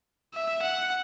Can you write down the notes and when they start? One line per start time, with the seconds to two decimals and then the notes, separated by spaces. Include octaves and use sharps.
0.34 E5
0.62 F#5